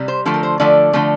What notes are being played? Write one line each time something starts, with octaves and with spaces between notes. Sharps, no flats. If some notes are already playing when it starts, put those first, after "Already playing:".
Already playing: C3 G3
C5
D3 F3 A3
A#4
C5
D3 F3 A3 D5
D3 F3 A3